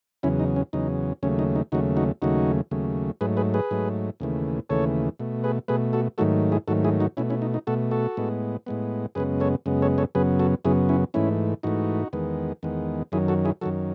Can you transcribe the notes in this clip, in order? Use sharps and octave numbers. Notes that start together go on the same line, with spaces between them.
E2 C#3 F#3 C#4 E4
D#4
C#4
E2 C#3 F#3 D#4
D#2 C#3 F#3 A3 C#4
D#4
D#4
D#2 C#3 F#3 A3 D#4 F#4
D#4 F#4
D#2 C#3 F#3 A3 D#4 F#4
D#2 C#3 F#3 A3
G#2 F#3 A3 G#4 B4
G#4 B4
G#4 B4
G#2 F#3 A3
D#2 C#3 E3 A3
D#2 C#3 E3 A3 A4 C#5
B2 A3
G#4 B4
B2 A3 G#4 B4
F#4 A4
G#2 D#3 F#3 A3 F#4 A4
E4 G#4
G#2 D#3 F#3 A3 F#4 A4
E4 G#4
D#4 F#4
B2 A3 C#4 E4
C#4 E4
D#4
D#4
B2 A3 F#4 A4
F#4 A4
A2 G#3 B3
A2 G#3 B3
F#2 C#3 G#3 B3 G#4 B4
A4 C#5
F#2 C#3 G#3 B3
A4 C#5
A4 C#5
F#2 C#3 F#3 B3 G#4 B4
F#4 A4
F#2 C#3 F#3 B3 E4 G#4
C#4 E4
G#2 E3 A3 C#4 E4
G#2 E3 A3 D#4 F#4
E2 D#3 G#3 B3
E2 D#3 G#3 B3
F#2 D#3 F#3 E4 G#4
F#4 A4
E4 G#4
F#2 D#3 F#3 F#4 A4